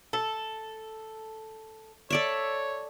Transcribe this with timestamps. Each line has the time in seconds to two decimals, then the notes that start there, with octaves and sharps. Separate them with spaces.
0.13 A4
2.10 A4 C#5 D5 E5